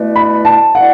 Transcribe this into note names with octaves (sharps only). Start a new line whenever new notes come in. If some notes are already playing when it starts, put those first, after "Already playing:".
Already playing: B2 A3 E4 B4 D5
B5
A5
B2 A3 E4 B4 D5 F#5